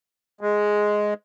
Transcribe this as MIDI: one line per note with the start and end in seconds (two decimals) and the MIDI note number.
0.41 1.14 56